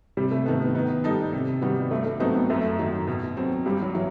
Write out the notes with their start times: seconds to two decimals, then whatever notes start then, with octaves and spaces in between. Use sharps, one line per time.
0.17 C3 G3
0.31 A3
0.46 D#3 A3 B3
0.60 B3
0.75 D#3 B3
1.04 G3 D#4 A4
1.33 C3
1.62 D#3 G3 B3 F#4
1.91 G2 A3
2.06 A3
2.20 F#3 A3 B3 C4 D#4
2.35 B3
2.50 F#2 A3
2.78 D#3 F#3
3.08 B2
3.37 F#3 C4
3.65 G2 G3
3.82 F#3
3.94 E3 F#3